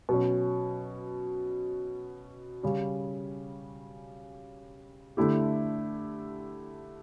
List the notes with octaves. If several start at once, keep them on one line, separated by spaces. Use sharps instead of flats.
B2 F#3 C#4
C#3 G3 C#4
D3 A3 E4 G4